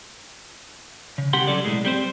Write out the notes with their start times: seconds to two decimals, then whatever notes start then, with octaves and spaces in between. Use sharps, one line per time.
1.18 C#3
1.33 C2 C#3 G4 F#5 C6
1.47 F#3 C#4 A4 D5
1.65 B1 A2 G#3
1.85 G3 C4 C5